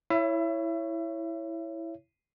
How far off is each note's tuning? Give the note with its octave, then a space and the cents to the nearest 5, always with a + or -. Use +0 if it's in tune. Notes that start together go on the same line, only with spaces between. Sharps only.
E4 +0 C#5 +0 E5 +30